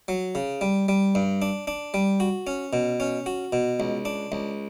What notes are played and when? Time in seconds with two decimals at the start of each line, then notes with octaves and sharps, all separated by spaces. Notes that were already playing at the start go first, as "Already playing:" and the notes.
0.08 F#3
0.35 C#3
0.61 G3
0.88 G3
1.15 G2
1.42 D4
1.67 D4
1.94 G3
2.20 F#4
2.47 C#4
2.73 B2
3.00 C#4
3.26 F#4
3.53 B2
3.80 C#2
4.05 D4
4.32 C#2